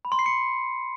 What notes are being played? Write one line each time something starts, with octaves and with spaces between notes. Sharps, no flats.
B5
C6
C7
C#7